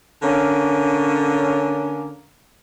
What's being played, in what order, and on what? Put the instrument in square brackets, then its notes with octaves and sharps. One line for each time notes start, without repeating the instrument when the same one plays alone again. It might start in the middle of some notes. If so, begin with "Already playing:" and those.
[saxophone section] D3 A#3 C#4